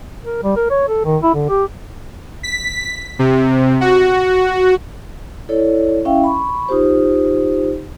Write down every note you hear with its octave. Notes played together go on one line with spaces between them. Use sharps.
A#4
G3
A#4
C#5
A4
D#3
E4
D3
G4
B6
C3
F#4
E4 A4 C#5 D5
C#4 E4 E5 F5 G5
B5 C#6
D#4 F4 G4 C5